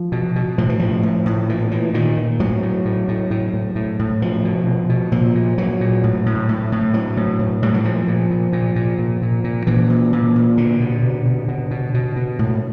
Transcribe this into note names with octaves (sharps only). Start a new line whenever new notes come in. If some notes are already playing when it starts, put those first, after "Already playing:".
Already playing: F3
B2
B2
A2 F3
E3
A2 F3
A2
A2
A#2 E3
A#2 E3
A#2 D#3
A#2
A2 F#3
A2
A2
A2
A2
A2
A2
A2
B2 F3
B2
B2
B2
A#2 F3
A#2
A#2 F#3
A#2
A2
A2
A2
A2
A2 F#3
A2
A2
A2 G3
F#3
A#2 F3
A#2
A#2
A#2
A#2
A#2
A#2
A#2
A#2 E3
A#2
A#2
A#2
B2 D3
B2
B2
B2
B2
B2
B2
B2
A2